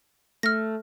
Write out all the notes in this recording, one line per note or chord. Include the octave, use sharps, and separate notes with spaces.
A3 F6 A#6